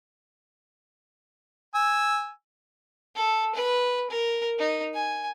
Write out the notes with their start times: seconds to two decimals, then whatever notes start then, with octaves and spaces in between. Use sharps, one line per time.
1.75 G#5 E6
3.16 A4
3.55 B4
4.10 A#4
4.59 D#4
4.95 G#5